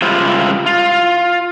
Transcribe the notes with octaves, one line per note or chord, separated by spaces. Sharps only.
C#3 G3 G#3 E4 F4 C5
F4